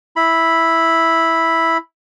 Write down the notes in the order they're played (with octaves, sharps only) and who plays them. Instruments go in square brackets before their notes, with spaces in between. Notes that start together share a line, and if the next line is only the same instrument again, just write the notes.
[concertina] E4 B5